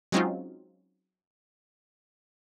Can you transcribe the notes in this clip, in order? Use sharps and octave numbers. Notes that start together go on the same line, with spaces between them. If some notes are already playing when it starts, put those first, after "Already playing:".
F#3 G#3 C4 C#4 D#4 F4